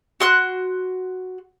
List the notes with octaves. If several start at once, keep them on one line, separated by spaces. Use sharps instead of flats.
F#4 C6 F#6